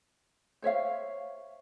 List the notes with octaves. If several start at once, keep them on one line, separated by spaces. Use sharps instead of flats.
C5 C#5 E5 F5